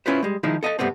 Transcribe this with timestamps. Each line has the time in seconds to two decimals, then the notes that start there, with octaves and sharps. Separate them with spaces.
0.06 C#4 E4 F4 B4 C5
0.23 G3 G#3
0.43 D#3 F3 G#3 D#4 E4
0.63 A4 D#5 E5 A5
0.79 G2 C3 A3 B3 C4